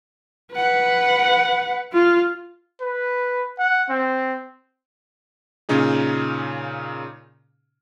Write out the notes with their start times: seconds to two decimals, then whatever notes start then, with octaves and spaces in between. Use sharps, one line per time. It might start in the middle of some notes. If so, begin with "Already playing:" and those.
0.53 B4 F#5
1.93 F4
2.81 B4
3.58 F#5
3.89 C4
5.69 A#2 C#3 C#4 D#4 G#4